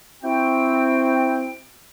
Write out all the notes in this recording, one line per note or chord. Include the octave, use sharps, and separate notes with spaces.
C4 E4 F#4 G5